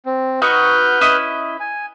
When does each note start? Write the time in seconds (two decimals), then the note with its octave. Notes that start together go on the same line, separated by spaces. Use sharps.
0.06 C4
0.42 D#4 F#4 B4 C#6 F6 G6
1.01 C#4 E4 D#5
1.60 G#5